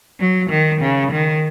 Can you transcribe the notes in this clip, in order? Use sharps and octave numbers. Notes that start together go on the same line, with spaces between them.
F#3
D#3
C#3
D#3